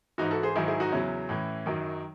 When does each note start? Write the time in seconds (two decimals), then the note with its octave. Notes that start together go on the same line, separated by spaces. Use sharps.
0.18 G#2 E3 D#4 F#4
0.31 F#4 A4
0.43 G#4 C5
0.55 G#2 D#3 F#3 E4 G#4
0.68 E4 G#4
0.80 D#4 F#4
0.92 E2 C#3 F#3 C#4 E4
1.29 A2 E3
1.66 F#2 D#3 F#3